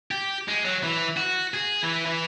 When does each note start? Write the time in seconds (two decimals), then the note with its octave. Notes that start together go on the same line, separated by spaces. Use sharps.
0.11 G4
0.48 G#3
0.65 F#3
0.83 E3
1.17 F#4
1.54 G#4
1.83 E3
2.06 E3